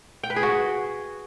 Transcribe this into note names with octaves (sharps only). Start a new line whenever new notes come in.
G5
B4
G#4
F#4